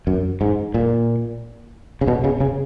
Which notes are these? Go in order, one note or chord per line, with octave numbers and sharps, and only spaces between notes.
F#2
G#2
A#2
C#3
B2
C#3
C#3